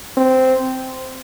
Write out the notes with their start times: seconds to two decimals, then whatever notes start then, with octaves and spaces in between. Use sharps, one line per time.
0.17 C4